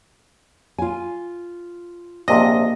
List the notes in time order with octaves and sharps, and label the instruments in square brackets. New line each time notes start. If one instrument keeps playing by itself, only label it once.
[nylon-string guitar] F4 G#5
[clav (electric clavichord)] A#1 C3 D4 [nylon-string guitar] A#3 [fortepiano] D#5